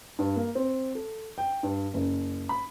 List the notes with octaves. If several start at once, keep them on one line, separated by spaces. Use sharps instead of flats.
G2
A#3
C4
A4
G5
G2
F#1
B5